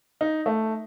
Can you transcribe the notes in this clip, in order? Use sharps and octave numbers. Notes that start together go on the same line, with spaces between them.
D#4
A3